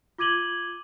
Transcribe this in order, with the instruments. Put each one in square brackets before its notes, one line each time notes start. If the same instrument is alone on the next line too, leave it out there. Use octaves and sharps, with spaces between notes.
[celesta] F4 D6 G#6 D#7 F#7 G7